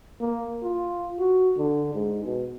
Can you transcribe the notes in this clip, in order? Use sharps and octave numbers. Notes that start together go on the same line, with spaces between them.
A#3
F4
F#4
D3
G#2
B2